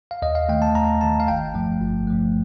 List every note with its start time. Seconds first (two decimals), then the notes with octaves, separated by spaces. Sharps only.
0.11 F5
0.22 D#2 D#5
0.35 F5
0.49 D#3 A3 G5
0.62 A5
0.75 D#2 A#5
1.01 D#3 A3 A5
1.20 F5
1.28 G1 G5
1.54 G2 F3 A3
1.80 G1
2.07 G2 F3 A3